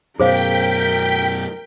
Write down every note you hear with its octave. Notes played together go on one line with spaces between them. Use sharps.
F#2 B2 G#4 A#4 C5 F5 G5 B6